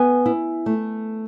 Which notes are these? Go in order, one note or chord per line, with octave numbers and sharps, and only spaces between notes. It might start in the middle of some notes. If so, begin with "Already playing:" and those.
Already playing: B3 G#5
E4
A3